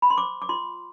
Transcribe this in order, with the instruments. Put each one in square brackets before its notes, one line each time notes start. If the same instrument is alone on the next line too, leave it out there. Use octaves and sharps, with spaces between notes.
[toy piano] B5
C6
C5 D6
D6
F4 C6